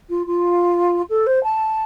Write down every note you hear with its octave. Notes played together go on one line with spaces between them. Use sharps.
F4
F4
A4
C5
A5